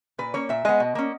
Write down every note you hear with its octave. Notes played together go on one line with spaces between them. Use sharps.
A#2 B4
A#3 C#4 C#5
A#2 E5
G#3 B3 D#5
B2
A#3 C#4